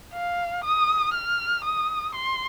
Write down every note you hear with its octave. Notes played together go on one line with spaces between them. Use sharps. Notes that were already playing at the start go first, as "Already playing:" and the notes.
F5
D#6
F6
D#6
C6